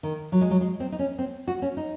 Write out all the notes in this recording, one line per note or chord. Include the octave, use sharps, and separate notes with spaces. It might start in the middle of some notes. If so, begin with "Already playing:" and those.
D#3
F#3
G#3
F#3
G#3
C4
D#4
C#4
C4
F#4
C#4
D#4